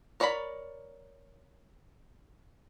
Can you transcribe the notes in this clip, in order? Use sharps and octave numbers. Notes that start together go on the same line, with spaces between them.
A#4 C#5 D5 A#5 B5